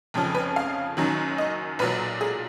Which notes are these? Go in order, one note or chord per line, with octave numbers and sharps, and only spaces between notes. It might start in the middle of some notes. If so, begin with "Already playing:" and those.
F1 F2 C#3 F3
B4
F5
F#1 F#2 D#3 F#3
D#5
B1 A#2 F#3 B4
G#4